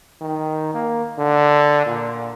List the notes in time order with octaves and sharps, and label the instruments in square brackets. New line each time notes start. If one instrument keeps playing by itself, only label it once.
[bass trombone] D#3
A#3
D3
A#2